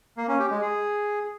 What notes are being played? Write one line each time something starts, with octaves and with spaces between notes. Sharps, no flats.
A#3
C#4
G4
G#3
G#4